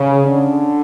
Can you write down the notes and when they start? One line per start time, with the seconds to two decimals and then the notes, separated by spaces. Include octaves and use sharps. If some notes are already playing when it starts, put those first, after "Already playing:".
Already playing: C#3
0.25 D3